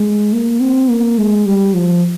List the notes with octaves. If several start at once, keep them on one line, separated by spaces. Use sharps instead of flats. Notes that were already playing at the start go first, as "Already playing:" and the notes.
Already playing: G#3
A#3
C4
A#3
G#3
G3
F3